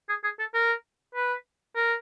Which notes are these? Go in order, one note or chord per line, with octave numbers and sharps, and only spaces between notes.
G#4
G#4
A4
A#4
B4
A#4